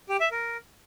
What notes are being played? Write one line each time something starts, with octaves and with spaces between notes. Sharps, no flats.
G4
E5
A#4